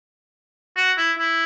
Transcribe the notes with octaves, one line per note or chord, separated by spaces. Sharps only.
F#4
E4
E4